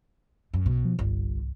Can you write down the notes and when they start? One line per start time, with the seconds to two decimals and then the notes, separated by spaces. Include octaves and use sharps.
0.54 F#2
0.66 B1 B2
0.85 F3
0.99 G1 C2